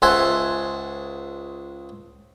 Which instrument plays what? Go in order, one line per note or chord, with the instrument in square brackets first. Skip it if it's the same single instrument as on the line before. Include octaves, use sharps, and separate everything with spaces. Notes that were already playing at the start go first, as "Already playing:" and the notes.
[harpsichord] C#2 C5 E5 F#5 G#5 A5